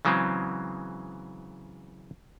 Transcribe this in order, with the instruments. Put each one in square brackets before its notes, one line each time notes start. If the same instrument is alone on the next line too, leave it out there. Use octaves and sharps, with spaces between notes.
[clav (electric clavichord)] C#3 E3 F#3 G#3 C4